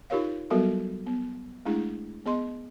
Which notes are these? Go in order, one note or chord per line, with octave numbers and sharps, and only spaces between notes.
D#4 F4 G4 A#4 C#5 F5
F#3 G3 B3 F#4 A4 A#4
B3
G#3 A3 D4 E4 G#4
B3 G#4 D#5 C6